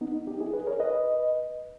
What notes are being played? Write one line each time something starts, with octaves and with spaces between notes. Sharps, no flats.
B3 D#4
D#4 G4
E4 G#4
G#4 B4
A#4 C#5
B4 D#5